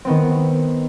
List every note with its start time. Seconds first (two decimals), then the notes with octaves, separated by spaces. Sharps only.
0.05 D#3 B3 C4